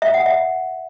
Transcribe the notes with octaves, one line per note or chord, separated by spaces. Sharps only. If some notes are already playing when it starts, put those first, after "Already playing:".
E5
F#5
E5